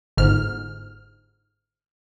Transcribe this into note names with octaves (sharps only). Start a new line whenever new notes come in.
G1 G#2 F6